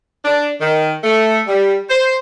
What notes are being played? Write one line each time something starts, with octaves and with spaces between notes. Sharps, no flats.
D4
D#3
A3
G3
C5